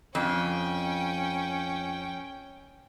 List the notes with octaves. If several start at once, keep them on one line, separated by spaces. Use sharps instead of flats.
F2 C#4 G5